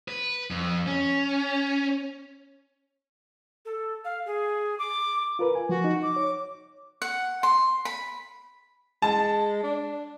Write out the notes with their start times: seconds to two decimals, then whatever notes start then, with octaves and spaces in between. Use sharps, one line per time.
0.08 B4
0.51 F2
0.87 C#4
3.65 A4
4.05 F5
4.26 G#4
4.79 D6
5.39 F4 A#4 B4
5.55 G#5
5.69 F3 F#4
5.84 D#4
6.02 D6
6.16 C#5
7.02 F#5
7.43 C6
7.85 B5
9.02 G#3 A5
9.63 D4